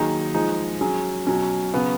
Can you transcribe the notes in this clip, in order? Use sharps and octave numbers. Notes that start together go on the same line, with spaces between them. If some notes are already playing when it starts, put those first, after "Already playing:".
Already playing: D#3 F#3 A#3 D#4 G#4
F3 G#3 D#4 G#4
F#3 C#4 G#4
B2 F#3 C#4
C#3 F#3 B3